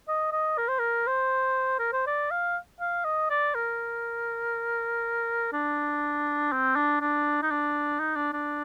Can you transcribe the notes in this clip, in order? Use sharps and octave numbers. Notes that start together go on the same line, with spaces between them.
D#5
D#5
A#4
C5
A#4
C5
A#4
C5
D5
F5
F5
D#5
D5
A#4
D4
C4
D4
D4
D#4
D4
D#4
D4
D4